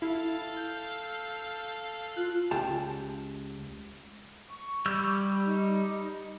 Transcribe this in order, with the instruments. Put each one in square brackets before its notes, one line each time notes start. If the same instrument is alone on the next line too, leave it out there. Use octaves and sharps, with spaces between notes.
[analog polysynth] E4 [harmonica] A4 F5
[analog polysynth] G6
[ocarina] F4 [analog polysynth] F#6
[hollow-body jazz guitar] C#2 G4 A5
[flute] C#6
[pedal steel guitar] G3 E6 G6
[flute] D#4